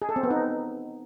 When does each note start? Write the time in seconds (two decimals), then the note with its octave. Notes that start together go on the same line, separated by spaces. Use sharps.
0.02 G#4
0.09 A4
0.16 C4
0.23 B3
0.31 D#4